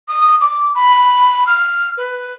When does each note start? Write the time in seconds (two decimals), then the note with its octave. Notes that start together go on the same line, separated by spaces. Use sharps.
0.08 D#6
0.40 D6
0.74 B5
1.47 F6
1.97 B4